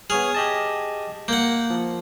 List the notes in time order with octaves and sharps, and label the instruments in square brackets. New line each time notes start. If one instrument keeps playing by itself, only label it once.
[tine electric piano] B3 C#5 F6 [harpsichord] G#4
[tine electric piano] G4 D#5 A5
[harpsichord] A#3 F#5 [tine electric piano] G6
[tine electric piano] F3